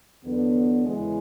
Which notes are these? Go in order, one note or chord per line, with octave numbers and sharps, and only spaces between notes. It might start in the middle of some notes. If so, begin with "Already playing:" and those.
E2 D3 F#3 B3
E2 C#3 E3 G#3